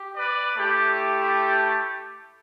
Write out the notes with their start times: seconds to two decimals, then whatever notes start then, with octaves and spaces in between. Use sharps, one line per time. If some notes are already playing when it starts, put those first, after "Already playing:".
Already playing: G4
0.17 B4 D5
0.56 A3 E4 G4